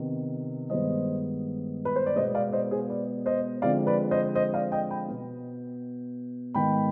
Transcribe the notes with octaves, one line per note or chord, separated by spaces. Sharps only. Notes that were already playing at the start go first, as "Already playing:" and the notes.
Already playing: C3 D#3 B3
G2 D#3 G#3 B3 C5 D#5
B4
C5
D5
B2 G#3 B3 C5 D#5
D5 F5
C5 D#5
G#4 C5
B4 D5
C5 D#5
D3 F3 G#3 C4 D5 F5
B4 D5
C5 D#5
C5 D#5
D5 F5
D#5 G5
G5 B5
B2 B3
G#2 D#3 B3 G5 B5